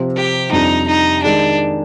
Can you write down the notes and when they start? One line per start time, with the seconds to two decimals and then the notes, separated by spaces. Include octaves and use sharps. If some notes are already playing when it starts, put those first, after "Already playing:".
Already playing: C3 F3 C4 F4
0.16 G4
0.51 F2 C3 G3 D4 D#4 G4
0.87 D#4
1.23 D#3 G#3 D4 D#4 G#4